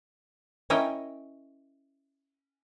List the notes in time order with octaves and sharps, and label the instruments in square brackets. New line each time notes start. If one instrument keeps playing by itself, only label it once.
[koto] C#4 E4 A#4 D#5 G5 G#5